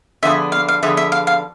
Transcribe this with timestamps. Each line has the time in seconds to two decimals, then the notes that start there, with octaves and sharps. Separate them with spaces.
0.23 D3 F3 B3 D4 G#4 E5
0.52 F5
0.69 F5
0.82 D3 F3 B3 D4 G#4 E5
0.97 E5
1.12 F5
1.27 F5